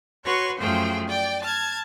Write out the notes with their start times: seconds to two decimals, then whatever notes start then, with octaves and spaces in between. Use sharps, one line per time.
0.25 F#4 B4 C#5 C6 C#6
0.60 F#2 F3 A3 G#4 C5 G5
1.07 D5 G5
1.43 A5 F6 G#6